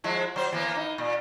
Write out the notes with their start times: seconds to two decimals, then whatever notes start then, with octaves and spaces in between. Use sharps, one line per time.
0.04 F3 G#3 E4
0.36 F#3 C5
0.52 E3 A#3 B3
0.76 D#4
0.98 A#2